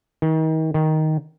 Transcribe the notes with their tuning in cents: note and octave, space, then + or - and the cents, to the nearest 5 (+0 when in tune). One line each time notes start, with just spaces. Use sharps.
D#3 +35
D#3 +5